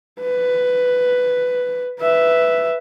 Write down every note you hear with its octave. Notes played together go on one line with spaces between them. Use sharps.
B4
B4 E5